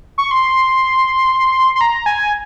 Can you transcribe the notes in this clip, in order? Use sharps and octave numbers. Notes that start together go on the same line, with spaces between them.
C#6
C6
C6
A#5
G#5